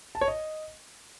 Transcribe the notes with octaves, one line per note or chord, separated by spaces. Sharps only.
A5
C#5
D#5